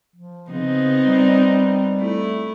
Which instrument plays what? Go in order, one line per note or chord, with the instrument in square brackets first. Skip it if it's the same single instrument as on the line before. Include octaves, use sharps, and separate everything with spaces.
[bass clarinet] F3
[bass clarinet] C#3 [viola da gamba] B3 C4 D#4
[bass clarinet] G3
[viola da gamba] A3 E4